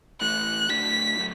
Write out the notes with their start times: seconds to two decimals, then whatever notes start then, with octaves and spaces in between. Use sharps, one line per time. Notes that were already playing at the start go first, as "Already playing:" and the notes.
0.21 A2 E3 A3 E4 F#6
0.69 A2 A3 D4 F#4 B6
1.18 A2 F#3 A3